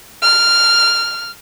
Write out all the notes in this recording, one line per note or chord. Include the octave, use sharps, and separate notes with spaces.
F6